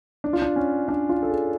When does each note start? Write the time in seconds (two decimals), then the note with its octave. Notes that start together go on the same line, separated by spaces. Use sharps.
0.24 D4
0.33 F4
0.42 D4
0.56 C#4
0.88 D4
1.09 F4
1.23 A4
1.30 G#4